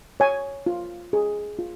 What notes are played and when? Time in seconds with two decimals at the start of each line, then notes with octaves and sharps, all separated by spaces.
0.20 C#5 G#5
0.66 F4
1.13 G#4
1.59 F4